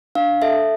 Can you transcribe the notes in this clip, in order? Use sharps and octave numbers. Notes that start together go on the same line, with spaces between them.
D4 F5
A4 E5